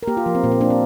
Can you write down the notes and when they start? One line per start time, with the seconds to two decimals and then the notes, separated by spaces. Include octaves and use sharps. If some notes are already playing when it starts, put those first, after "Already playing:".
0.03 A#4
0.07 A#3 G4
0.17 F4
0.26 F3
0.35 C4
0.43 A#2 A#3
0.52 C4
0.61 A#3 D4
0.70 C4